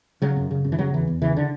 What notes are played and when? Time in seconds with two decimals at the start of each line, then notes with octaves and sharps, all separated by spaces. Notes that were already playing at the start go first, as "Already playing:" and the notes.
0.22 C#3 F#3
0.36 F#2
0.51 C#3
0.64 F#2
0.72 E3
0.79 C#3 F#3
0.93 E2 E3
1.07 E2
1.22 C#3 E3
1.36 D3